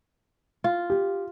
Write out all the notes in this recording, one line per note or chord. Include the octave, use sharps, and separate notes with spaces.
F4
G4